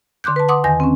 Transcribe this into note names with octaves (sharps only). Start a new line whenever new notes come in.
D3 C6 D6 F#6 G6
B4 A5
F#5 C6 D6 D#6
E2 D#3 G#5 A#6
C4 C#4